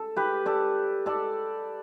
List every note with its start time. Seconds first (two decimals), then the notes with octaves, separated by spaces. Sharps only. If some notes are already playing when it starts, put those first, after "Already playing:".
Already playing: A4
0.16 G4 B4
0.46 A4 D5
1.06 A4 D5